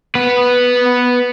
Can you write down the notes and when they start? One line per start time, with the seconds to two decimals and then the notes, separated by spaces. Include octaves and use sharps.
0.15 B3 B4